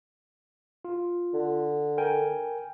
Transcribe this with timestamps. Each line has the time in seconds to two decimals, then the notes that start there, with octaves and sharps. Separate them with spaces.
0.85 F4
1.33 D3
1.98 A#4 G5 G#5